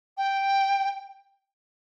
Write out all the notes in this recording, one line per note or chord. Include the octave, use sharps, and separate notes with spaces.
G5